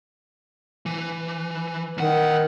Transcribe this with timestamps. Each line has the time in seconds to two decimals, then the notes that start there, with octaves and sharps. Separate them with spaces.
0.86 E3
1.97 E2 D#3 F#5